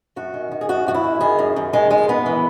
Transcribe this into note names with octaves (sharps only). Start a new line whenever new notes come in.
F#2 F#4
D#3
D#3
G#4
F#2 F#4
F#2 F#4
E4
D#3
D#3 G#4
F#2
F#2
D#3 G#3
D#3 G#3
F#2 B3
E3